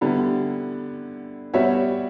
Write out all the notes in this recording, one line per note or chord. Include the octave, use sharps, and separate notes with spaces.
D3 G3 B3 E4
G3 B3 F#4 C#5 E5